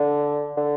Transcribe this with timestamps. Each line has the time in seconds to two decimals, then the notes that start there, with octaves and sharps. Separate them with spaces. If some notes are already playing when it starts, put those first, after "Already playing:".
Already playing: D3
0.57 D3